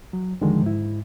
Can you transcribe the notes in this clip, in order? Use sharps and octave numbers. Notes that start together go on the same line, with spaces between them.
F#3
D#2 D3 D#3 F3 G#3
G#2 E4